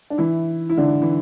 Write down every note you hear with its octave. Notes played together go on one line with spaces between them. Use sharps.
D4
E3 E4
E4
D3 D4
E3